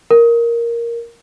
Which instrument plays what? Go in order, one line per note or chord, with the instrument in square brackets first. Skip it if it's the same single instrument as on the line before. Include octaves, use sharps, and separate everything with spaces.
[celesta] A#4